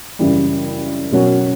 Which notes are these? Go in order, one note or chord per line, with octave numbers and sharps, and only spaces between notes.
F#2 C#3 E3 G3
B2 F#3 C#4 F#4 A#4